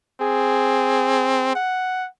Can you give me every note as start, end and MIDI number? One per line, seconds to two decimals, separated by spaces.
0.21 1.54 60
0.21 1.58 68
1.55 2.08 78